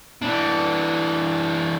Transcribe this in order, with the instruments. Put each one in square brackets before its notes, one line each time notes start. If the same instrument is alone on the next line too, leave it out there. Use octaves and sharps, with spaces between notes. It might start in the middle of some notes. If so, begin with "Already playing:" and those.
[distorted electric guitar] E3 D4